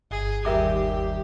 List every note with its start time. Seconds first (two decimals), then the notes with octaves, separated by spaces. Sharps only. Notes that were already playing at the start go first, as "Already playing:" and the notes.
0.11 G1 G#4
0.45 D#2 G3 G4 A#4 E5 D6